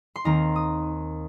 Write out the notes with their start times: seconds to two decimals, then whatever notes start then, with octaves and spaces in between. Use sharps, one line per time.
0.16 C6
0.24 D#2 D#3 C4 D#4 A#5
0.56 D#6